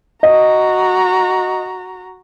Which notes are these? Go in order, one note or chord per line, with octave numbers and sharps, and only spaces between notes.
F#4 D#5 A#5